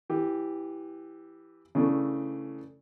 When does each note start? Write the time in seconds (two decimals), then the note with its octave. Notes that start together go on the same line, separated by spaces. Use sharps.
0.10 E3 G4
1.75 C#3 E3 A3 D4